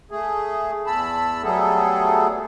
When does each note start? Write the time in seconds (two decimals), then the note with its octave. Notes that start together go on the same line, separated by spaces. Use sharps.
0.11 A3 G#4
0.86 E2 A5 B5 E6
1.43 F#3 G3 A3 B3 G#4 A4